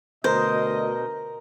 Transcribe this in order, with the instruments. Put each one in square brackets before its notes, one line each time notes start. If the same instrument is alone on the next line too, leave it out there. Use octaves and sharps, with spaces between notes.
[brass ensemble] D2 D#5 [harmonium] B2 [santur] A#4 [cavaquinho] C5